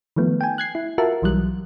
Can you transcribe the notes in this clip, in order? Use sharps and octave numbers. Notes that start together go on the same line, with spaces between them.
D#3 F3 A3 B3
G5 G#5
F#6 G#6 C7
E4
F4 F#4 A#4 E5 A5
B1 E3 F#3 G3 F#6